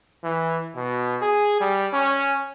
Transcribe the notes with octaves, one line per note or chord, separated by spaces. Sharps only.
E3
B2
G#4
G3
C#4